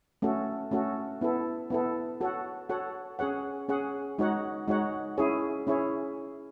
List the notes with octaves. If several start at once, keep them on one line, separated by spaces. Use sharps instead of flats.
A3 C#4 F#4 A4
A3 C#4 F#4 A4
B3 E4 A4
B3 E4 A4
F#4 A4 C#5 F#5
F#4 A4 C#5 F#5
C#4 G#4 C#5 F#5
C#4 G#4 C#5 F#5
G#3 D#4 F#4 C#5 F#5
G#3 D#4 F#4 C#5 F#5
C#4 E4 G#4 C#5
C#4 E4 G#4 C#5